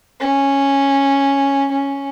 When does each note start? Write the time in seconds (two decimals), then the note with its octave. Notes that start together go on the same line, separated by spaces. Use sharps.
0.21 C#4
1.72 C#4